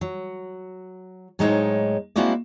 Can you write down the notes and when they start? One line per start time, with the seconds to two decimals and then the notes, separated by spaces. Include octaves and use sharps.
0.01 F#3
1.39 A2 F#3 G#3 D#4 C5 C#5
2.16 G#3 A#3 C4 E4 F#4 D5